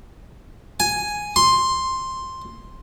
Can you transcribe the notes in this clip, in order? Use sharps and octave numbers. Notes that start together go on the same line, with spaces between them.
G#5
C6